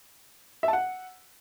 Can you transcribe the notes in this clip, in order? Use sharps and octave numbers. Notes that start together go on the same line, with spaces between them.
E5
A5
F#5